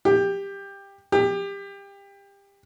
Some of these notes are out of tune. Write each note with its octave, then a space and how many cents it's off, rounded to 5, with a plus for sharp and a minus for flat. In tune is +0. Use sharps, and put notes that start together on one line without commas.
G4 +15
G4 +25